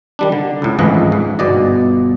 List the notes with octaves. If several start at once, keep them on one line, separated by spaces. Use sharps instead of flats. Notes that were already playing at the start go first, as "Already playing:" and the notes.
D#3 G3 D4
D3
C#2 A2
G#1 C#2 G#2 E3 F3 D#5
G#2
G1 B2 D5 D#5